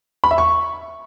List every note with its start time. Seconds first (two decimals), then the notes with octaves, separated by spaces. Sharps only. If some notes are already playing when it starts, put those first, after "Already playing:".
0.24 B5
0.31 E5
0.38 C#6